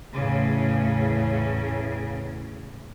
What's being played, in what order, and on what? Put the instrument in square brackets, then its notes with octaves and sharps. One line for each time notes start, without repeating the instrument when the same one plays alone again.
[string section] E2 A2 C#3